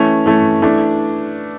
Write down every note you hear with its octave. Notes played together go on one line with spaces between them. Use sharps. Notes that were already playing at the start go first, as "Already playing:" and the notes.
Already playing: E3 A3 C#4
E3 A3 C#4
E3 A3 D4